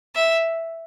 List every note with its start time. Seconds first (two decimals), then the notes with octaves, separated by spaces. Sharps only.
0.15 E5